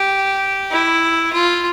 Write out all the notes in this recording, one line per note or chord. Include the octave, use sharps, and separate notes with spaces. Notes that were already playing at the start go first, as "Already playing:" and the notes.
Already playing: G4
E4
F4